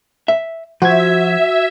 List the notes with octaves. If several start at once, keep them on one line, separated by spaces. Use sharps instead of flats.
E5
F3 F#4 E5 G#6